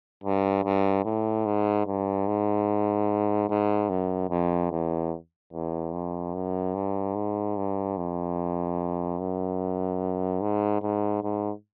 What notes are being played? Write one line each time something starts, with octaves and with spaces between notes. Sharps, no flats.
G2
G2
A2
G#2
G2
G#2
G#2
F#2
F2
E2
E2
F2
F#2
G2
G#2
G2
F2
F#2
G#2
G#2
G#2